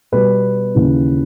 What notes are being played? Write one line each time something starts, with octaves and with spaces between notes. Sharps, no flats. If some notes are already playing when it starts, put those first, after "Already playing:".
B2 G3 B3 B4
D#2 C#3 E3